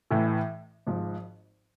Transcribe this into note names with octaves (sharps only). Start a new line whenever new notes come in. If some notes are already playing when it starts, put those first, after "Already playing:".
A1 A2 E3 A3 E4
G#1 G#2 F3